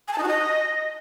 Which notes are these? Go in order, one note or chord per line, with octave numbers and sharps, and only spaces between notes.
G#5
A5
D#4
F#4
D#5